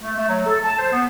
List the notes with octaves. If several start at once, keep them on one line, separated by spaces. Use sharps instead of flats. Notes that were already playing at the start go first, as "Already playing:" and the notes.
A3
A3
F#3
A4
A5
C5
B3